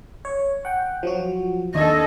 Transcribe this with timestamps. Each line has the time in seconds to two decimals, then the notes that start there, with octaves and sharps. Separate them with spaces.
0.25 C#5
0.65 F#5 G5
1.03 F3 F#3 F#4
1.75 D#2 D4 A4 D#5 G#6